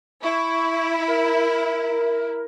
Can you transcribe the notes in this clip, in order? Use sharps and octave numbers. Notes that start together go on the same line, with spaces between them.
E4 C#6
A#4